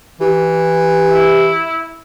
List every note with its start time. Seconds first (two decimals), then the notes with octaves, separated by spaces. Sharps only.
0.20 E3 G4
1.13 E4